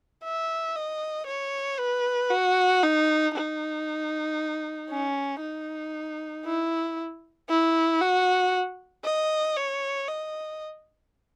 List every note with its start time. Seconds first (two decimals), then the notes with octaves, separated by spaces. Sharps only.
0.24 E5
0.76 D#5
1.26 C#5
1.78 B4
2.30 F#4
2.83 D#4
3.34 D#4
4.90 C#4
5.42 D#4
6.45 E4
7.49 E4
8.01 F#4
9.04 D#5
9.56 C#5
10.08 D#5